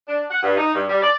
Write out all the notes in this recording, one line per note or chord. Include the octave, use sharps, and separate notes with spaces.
D4
F#5
G2
D#4
G2
G3
D5